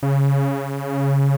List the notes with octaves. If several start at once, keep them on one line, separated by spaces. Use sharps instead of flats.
C#3